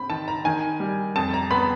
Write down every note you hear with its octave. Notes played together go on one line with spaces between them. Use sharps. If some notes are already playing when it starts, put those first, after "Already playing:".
Already playing: C4 B5
D#3 A5
A#5
D#3 G#5
G3
F2 A5
A#5
B3 B5